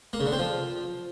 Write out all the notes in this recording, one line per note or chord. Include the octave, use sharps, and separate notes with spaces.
A#3
C#3
D3
C4
F3